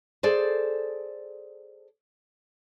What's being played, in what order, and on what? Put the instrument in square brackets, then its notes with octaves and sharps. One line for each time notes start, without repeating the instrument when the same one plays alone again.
[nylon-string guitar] G#4 A4 C5 D5